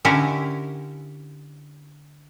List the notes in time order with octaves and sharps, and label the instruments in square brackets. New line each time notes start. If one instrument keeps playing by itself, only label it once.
[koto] D3 C#4 E4 G4 A#4